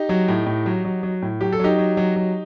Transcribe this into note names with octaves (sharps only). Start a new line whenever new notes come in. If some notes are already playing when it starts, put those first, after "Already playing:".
Already playing: D#4 G4
F#3
A2
A2
F#3
F#3
F#3
A2
F#3 G4
A4
F#3 D#4 G4
F#3
F#3
F#3